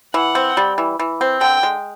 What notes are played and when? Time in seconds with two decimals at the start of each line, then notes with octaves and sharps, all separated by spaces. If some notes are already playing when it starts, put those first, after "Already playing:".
0.14 E3 F#5
0.35 C4
0.57 G3
0.78 E3
0.99 E3
1.21 C4
1.41 D3 G5
1.63 G#3